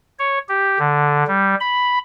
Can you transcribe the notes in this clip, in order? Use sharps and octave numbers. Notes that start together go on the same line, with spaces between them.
C#5
G4
D3
G3
B5